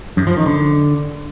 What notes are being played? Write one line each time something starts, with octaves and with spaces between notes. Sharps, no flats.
F#2
F3
D#3
D3